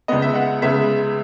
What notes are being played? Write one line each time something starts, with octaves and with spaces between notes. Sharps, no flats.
C#2 C#3 G#3 B3 D#5
E5
F#5
C#2 C#3 G#3 B3 E5